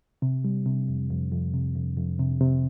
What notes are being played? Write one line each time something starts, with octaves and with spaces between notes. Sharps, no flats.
C3
G3
C3
F2
F2
F2
C3
F2
F2
C3
C3